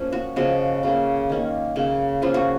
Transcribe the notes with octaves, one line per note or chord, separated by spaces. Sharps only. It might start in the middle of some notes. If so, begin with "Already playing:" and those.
Already playing: F3 A#3 C#4
F#4
C#3 F3 G#3 C#4 F#4
C#3 F#3 A#3
D#3 A#3 C#4
C#3 F#3 A#3
F3 A#3 C#4 F4
F#4